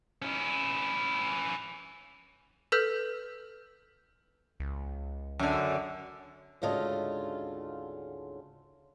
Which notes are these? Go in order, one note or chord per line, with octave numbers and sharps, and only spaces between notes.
C#4 E4
A4 B4 E6 F6 G6 B6
C#2
F#2 D3
D2 G#2 C#3 F4 A4 D#5